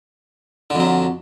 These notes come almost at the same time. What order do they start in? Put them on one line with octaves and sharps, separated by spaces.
D3 F2 F#3